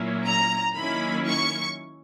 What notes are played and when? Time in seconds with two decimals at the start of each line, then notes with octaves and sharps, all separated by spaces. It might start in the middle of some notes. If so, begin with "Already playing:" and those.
Already playing: A#2 F#3 A#3 C#4 E4
0.25 A#5
0.76 D#3 F#3 A#3 C#4 E4 B5
1.27 C#6